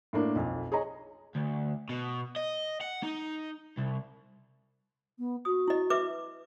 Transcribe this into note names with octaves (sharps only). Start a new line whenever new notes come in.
A2 A#3 D4
B1 F2
G#4 C#5 D#5 A#5
D2
B2
D#5
F#5
D#4
C2
B3
F#4 D#6
E4 D#5
B4 E5 D6